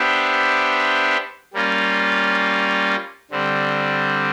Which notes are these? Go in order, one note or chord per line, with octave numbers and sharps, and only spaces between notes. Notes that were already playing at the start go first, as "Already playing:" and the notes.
Already playing: B3 D4 G4 C5 E5
G3 A#3 C#4 F4
D3 G3 C4